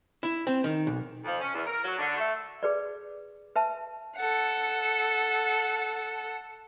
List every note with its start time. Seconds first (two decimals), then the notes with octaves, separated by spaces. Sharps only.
0.23 E4
0.47 C4
0.64 D#3
0.87 B1
1.24 F2
1.40 C#4
1.54 E2
1.66 A#4
1.83 F#3
1.99 D3
2.17 A3
2.63 G#4 B4 D5
3.56 B4 E5 A5
4.16 A4 F#5